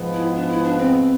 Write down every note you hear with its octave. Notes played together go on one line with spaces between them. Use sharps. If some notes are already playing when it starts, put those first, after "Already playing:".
Already playing: G#2 F3 B3
E4
D4
E4
D4
C4